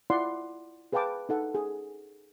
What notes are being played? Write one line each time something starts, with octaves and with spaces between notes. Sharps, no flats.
E4 F4 D5 F#5 C6
G#4 B4 F5 G5 A5 D6
D#4 A4 F#5
G#4